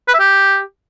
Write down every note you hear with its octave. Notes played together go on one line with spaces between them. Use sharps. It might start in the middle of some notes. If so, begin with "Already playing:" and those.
B4
E5
G4